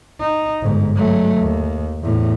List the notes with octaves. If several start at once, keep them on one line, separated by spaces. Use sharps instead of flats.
D#4
G1 G#2
F#3 A3
D#2
E2 A2